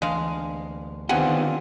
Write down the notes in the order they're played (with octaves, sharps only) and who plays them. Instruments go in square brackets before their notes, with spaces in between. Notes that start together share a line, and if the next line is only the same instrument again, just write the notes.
[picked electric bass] D2 E3 D4 [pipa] G#3 F5
[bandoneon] D3 C4 F4 [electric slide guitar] D#3 B3 G4 [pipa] F#5 G#5